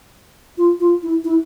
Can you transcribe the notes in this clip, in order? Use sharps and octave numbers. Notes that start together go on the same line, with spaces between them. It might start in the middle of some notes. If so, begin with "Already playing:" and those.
F4
F4
E4
E4